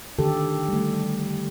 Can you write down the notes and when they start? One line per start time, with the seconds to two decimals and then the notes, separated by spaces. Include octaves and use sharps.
0.19 D3 D#3 G4 A4
0.68 G3 A3